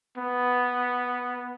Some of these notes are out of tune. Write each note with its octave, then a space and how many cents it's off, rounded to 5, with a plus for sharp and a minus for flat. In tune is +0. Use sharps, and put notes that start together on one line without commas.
B3 +0